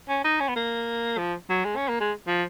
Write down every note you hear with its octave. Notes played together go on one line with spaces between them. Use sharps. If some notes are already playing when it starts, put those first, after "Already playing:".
C#4
D#4
C#4
B3
A#3
F3
F#3
G#3
C#4
A#3
G#3
F3